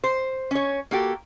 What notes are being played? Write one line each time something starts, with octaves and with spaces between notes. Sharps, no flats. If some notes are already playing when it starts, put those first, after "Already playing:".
C5
C#4 C#5
A#3 F#4 G4 A4